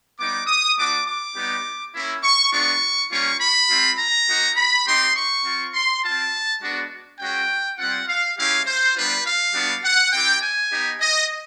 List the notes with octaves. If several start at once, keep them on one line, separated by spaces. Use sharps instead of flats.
G3 B3 D#4 D6
D#6
A3 D4 F#4 D6
D6
G3 B3 D#4 G4
A#3 C#4 E4
C#6
G#3 B3 D4 F4 C#6
G3 A#3 C#4 F4 C#6
B5
G#3 C4 F4
A#5
A#3 D#4 F#4
B5
C4 D#4 G4 C6
C#6
C4 F4
C6
C4 F4 A5
G#3 B3 D4 F#4
G#3 C#4 F#4 G5
G3 C4 F4 F#5
F5
G#3 C#4 E4 G4 F5
C5
G3 B3 D4 F4 B4
F5
G3 B3 D4 F#4
F#5
C4 E4 G4 G5
G#5
B3 D#4 G4
D#5